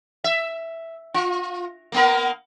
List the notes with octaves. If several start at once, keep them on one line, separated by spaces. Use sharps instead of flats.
E5
F4
A#3 B3 A#4